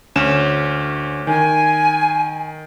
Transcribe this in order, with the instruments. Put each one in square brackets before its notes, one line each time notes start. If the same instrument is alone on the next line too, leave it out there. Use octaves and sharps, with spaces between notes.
[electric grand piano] D2 C#4 E7
[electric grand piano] D#3 [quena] G#5